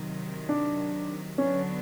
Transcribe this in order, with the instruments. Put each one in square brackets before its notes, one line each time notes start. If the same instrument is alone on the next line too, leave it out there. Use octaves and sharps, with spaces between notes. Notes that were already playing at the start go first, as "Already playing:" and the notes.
Already playing: [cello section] C3 D#3 F#3
[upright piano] D4
[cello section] D3 F#3 B3 D4 F#4 [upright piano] C#4